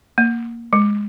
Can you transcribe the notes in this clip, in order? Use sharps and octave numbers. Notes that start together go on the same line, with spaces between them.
A#3
G#3